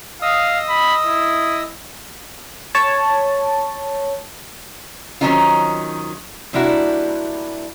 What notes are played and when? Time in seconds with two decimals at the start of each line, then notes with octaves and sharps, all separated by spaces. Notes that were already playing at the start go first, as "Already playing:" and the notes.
0.22 D#5 F5 D#6 E6
0.69 B5
1.07 E4
2.75 C#5 A5
5.21 D#3 F#3 C4 C#4 D#4 F4
6.53 C3 G3 A#3 D4 E4 F#4